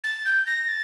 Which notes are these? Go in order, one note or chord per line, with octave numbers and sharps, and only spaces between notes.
A6
G6
A#6
A6